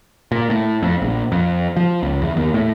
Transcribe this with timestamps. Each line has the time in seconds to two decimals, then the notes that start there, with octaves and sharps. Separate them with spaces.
0.32 A#2
0.50 A2
0.83 F2
1.02 A#1
1.32 F2
1.77 F3
2.03 C#2
2.22 E2
2.36 D#2
2.54 A2